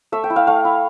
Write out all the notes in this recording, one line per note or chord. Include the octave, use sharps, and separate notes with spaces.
A3 E5
G5
E4
F5
A3 F5
E4